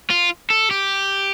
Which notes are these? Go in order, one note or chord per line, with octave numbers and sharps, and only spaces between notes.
F4
A4
G4